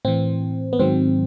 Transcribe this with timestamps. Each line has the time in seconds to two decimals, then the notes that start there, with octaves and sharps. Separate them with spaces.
0.05 A2 E3 C4
0.73 B3
0.79 G#2 D#3 F#3 C4